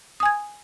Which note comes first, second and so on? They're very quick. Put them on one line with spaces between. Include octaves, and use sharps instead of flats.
D#6 G#5 G#6